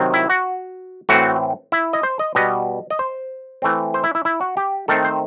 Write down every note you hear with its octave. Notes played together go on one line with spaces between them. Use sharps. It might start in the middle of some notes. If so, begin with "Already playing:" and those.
Already playing: C3 D#3 F#3 C4
E4
F#4
A2 E3 A3 C4 F#4
E4
D#5
C5
D#5
B2 G3 B3 D#5
D#5
C5
E3 A3 C4
C5
E4
E4
E4
F#4
G4
D#3 A3 C4 A4
C5